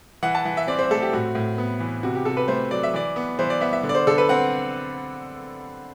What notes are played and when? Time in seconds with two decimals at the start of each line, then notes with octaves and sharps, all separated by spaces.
0.23 E3 F#5
0.35 A5
0.45 E3
0.57 E5
0.67 C4 D5
0.79 C5
0.91 A3 A4
1.02 G4
1.13 A2 F#4
1.35 A2
1.58 B3
1.80 E3
2.03 C3 F#4
2.15 G4
2.25 C3 A4
2.37 B4
2.48 A3 C5
2.70 F#3 D5
2.83 E5
2.94 E3 D5
3.16 B3
3.39 E3 C5
3.50 D5
3.61 B3 E5
3.73 E5
3.83 D3
3.89 D5
3.95 C5
4.07 D3 A4
4.18 B4
4.29 C4 F#5